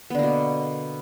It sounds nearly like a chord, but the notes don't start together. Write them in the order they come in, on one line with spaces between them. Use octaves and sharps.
B3 D3 A#3 B2